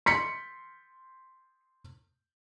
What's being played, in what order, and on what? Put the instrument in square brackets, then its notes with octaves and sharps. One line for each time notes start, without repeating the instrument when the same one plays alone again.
[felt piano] C6 B6 C#7